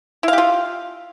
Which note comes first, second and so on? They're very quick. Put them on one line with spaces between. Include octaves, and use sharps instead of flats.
E4 F5 G4 F4